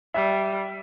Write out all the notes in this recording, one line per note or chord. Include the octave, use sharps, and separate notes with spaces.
G3 E5